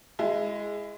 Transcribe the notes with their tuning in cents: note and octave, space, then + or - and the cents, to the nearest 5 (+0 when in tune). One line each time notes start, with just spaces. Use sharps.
G#3 +0 E4 +25